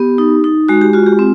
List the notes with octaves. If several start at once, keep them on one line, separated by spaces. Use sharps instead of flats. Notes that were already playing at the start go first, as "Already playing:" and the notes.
Already playing: B3 G4
D#4
D#4
G#3 F#4
G4
F4 F#4
G4
C4